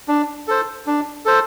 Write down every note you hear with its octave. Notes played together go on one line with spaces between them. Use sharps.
D4
A4 C5
D4
A4 C5